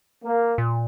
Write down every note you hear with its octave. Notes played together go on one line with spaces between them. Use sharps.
A#3
A#2